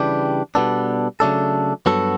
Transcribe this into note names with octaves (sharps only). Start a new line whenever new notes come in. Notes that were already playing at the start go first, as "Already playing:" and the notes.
Already playing: C#3 E3 G3 D4 G4
B2 G3 B3 D4 A4
C#3 F#3 A3 D4 A4
G2 F#3 B3 F#4 A4